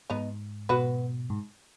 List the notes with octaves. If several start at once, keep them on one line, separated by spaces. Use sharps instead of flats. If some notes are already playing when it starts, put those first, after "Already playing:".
G#2 B3 D#4
B2 F#4 B4
G#2